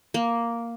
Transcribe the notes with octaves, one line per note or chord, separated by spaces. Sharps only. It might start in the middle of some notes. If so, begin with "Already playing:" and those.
A#3